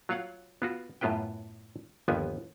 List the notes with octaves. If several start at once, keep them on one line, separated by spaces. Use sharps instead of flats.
F#3 F4 C#5 F5 F#5
B3 F4 F#4
F#2 A2 B3 F4 B4 G5
G1 D#2 F3 B3 G#5